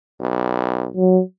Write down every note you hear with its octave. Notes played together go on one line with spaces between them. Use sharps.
B1
F#3